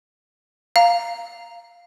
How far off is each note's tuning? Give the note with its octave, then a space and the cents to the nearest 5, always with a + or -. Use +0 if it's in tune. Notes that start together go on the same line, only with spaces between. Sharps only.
F5 +0 A#5 +0